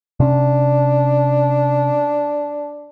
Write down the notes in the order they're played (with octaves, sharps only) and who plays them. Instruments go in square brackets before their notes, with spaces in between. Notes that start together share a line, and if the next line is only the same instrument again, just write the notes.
[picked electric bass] C3 C#4 [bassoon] D4